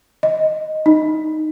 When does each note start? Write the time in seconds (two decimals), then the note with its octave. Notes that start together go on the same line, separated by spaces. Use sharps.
0.23 D#5
0.86 D#4